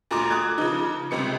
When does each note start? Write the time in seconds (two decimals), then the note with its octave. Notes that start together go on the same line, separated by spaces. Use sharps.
0.11 D2 A#2 A#5 C6 D6
0.31 D6 D#6 F#6 G#6
0.58 C#3 F3 D#4
1.11 G1 C#2 C3 C#7